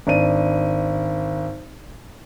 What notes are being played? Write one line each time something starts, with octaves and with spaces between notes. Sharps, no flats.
G#1 D4 D#7